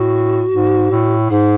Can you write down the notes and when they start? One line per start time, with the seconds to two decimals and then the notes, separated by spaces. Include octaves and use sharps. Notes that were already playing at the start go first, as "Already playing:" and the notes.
Already playing: A2 F#4
0.52 G#2
0.91 A2
1.30 G#2 G#4